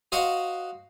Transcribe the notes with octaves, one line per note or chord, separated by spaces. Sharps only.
F#4 C5 D#5 F5 F#5